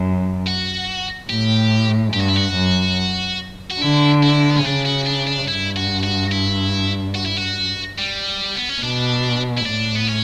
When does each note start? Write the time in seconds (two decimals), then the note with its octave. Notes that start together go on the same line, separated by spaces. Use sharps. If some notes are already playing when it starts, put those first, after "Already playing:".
Already playing: F#2
0.47 F#4
1.30 A2 G4
2.13 G2 G4
2.21 F#4
2.29 E4
2.36 F#4
2.55 F#2
3.70 F#4
3.80 D3 E4
4.23 E4
4.50 B3
4.58 C#4
4.64 C#3 D4
4.85 F#4
5.07 D4
5.27 D4
5.48 G2 E4
5.76 F#4
6.03 F#4
6.32 E4
7.15 F#4
7.26 E4
7.37 F#4
7.98 G3
8.55 B3
8.69 C#4
8.82 B2 D4
9.58 E4
9.66 A2 D4
9.96 B3
10.08 C#4